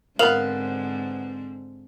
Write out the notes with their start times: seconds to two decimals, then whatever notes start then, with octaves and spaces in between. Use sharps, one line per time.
0.19 G#2 D3 B3 C4 A#4 F5 F#7